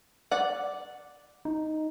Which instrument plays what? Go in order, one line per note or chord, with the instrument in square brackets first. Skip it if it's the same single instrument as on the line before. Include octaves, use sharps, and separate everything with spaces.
[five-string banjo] D5 F#5
[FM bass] D#4